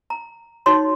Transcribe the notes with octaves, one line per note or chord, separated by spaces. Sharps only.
A#5
D#4 F#4 C#5 C6